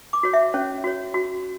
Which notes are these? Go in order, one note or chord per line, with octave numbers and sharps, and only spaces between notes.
D6
F#4 C#5
E5
C#4 C#5
F#4 C#5
F#4